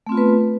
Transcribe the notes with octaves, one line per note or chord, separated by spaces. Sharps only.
A3 B3 C4 F4 B4